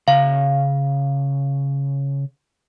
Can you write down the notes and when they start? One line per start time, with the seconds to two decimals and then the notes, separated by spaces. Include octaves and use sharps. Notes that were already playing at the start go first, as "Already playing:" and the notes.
0.08 C#3 F5 A#5